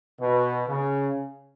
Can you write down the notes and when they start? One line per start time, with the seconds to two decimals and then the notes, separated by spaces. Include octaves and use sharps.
0.20 B2
0.68 C#3